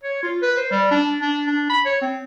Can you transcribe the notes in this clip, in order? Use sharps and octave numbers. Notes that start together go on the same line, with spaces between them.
C#5
F4
B4
C5
G3
D4
D4
D4
B5
C#5
C4